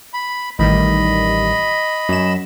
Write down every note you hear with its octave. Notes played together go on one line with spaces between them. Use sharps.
B5
A1 D#3 G3 D#5 B5
F#2 E7